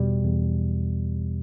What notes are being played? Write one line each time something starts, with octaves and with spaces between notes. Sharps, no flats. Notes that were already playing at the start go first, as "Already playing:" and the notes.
Already playing: E2 B2 G3
E2